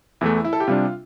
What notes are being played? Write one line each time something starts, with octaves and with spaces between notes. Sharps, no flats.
E2 E3 A3 E4
E4
A4
G4
C3 G3 D4 F4